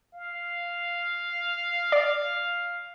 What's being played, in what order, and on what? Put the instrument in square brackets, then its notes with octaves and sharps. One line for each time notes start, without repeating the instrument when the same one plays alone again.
[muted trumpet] F5
[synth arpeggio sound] D5